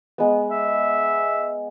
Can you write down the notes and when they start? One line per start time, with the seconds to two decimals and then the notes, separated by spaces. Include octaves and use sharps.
0.18 G#3 B3
0.50 E5